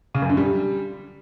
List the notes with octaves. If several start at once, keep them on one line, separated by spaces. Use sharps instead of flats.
C#3
F#2
D3
G3